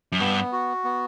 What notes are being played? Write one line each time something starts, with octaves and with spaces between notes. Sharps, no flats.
F#2
G2 B3
F#4
B3